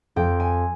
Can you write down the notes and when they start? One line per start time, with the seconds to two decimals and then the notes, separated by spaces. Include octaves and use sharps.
0.16 F2 G5
0.40 G#5